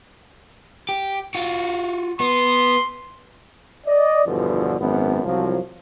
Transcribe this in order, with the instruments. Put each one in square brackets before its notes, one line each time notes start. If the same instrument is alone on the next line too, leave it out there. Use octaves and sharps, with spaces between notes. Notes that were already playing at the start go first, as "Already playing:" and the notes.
[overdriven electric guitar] G4
F4 F#4
[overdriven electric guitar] B3 [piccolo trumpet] C6
[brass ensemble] D5 D#5
G1 E2 G2 B2 D3 F3
G#1 F#2 B3
C2 F3 F#3